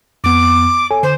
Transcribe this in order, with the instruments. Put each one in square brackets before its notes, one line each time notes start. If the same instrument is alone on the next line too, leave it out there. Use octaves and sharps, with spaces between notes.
[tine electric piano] F2 B3 [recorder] D6
[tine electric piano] A4 C#5 G#5
[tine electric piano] D3 [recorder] C5